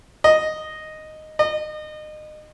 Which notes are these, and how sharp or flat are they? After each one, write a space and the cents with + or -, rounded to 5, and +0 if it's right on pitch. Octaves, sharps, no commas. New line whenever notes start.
D#5 -5
D#5 -30